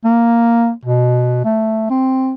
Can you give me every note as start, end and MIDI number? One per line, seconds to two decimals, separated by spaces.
0.05 0.71 58
0.85 1.43 47
1.45 1.88 57
1.90 2.33 60